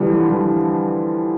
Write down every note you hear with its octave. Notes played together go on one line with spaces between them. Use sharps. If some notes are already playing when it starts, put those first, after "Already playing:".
Already playing: D3 E3 F3 G3
E3 G3